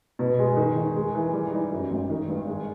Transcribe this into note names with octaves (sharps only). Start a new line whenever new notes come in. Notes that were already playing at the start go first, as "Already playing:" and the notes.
B2
G#3
D#3
D#3
G#3
E3
G3
D#4
F#2
G#1
D#3
G2
G#3